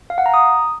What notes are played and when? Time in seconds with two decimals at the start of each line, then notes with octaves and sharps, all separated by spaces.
0.10 F5
0.18 F#5
0.26 A#5
0.34 D#6